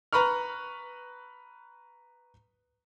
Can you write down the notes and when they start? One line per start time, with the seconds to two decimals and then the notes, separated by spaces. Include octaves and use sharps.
0.13 B4 A#5 B5 C#6 F6